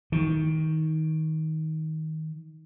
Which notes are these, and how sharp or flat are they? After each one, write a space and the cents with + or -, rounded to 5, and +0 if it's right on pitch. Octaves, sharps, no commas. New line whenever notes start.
D#3 +20